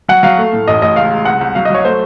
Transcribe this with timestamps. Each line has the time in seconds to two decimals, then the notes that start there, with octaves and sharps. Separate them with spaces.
0.08 F#3 F#5
0.23 F#3 F5
0.38 A3
0.53 A2
0.68 A1 D#5
0.82 A1 D#5
0.96 C#2 F5
1.11 C#2
1.25 C2 F#5
1.41 C2
1.55 F#3 F5
1.65 D#5
1.70 F#3 C#5
1.85 A3 C5